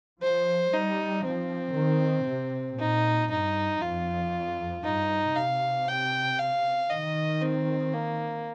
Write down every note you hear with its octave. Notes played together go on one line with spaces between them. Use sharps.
F3 C5
G3 D#4
F3 C4
D#3
C3
A#2 D#4
G2 D#4
F2 F4
G2 D#4
C3 F5
G5
F5
D#3 D#5
C4
A#3